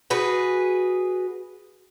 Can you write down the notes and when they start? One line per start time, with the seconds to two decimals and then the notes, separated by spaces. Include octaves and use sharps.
0.10 F#4 G#4 B4